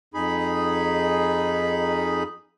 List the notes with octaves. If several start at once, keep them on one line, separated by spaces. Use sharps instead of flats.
F2 D#4 G#4 B5